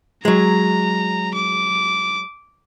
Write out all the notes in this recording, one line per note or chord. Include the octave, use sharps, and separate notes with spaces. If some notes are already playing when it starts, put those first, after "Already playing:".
F#3 G#3 A#5
D6